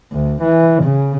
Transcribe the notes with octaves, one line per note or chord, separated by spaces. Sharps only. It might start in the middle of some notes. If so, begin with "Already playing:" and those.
D2
E3
C#3